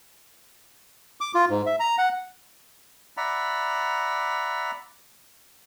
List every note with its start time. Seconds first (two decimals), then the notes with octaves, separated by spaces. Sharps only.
1.21 D6
1.35 F4
1.50 G#2
1.66 E5
1.80 A#5
1.98 F#5
3.17 D5 E5 F#5 A#5 B5